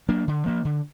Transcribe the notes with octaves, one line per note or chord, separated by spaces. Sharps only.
F#3 A#3 D4
D3
F3 A#3
D3